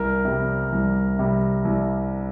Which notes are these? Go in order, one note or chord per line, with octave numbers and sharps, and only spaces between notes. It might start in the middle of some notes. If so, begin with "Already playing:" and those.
Already playing: C2 A#4
C3 G3
C2
C3 G3
C2